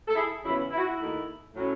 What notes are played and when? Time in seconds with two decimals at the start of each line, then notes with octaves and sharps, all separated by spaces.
0.08 A4
0.15 E4 G#4
0.43 E2 C#3 F#3 B3 E4
0.71 E4
0.78 F#4
0.85 E4
1.00 D#2 D#3 A3 D#4
1.55 A2 F#3 C#4